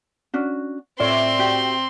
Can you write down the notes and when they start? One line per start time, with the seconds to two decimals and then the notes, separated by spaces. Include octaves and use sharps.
0.34 C#4 D4 F#4
1.00 A2 C4 F4 C#5 D5 E5 C6
1.39 F#4 G4